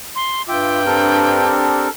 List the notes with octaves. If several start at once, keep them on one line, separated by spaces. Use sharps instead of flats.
C6
G2 F4 E5 G5 D6
C4 D4 G4 A4 A#4